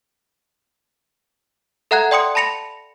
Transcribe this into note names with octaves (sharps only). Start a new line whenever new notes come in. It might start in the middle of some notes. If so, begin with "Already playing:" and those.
A4 E5 F#5 A#5 F#6 G#6
D5 G5 C6 D#6 C#7
A5 B5 A#6 C#7 F7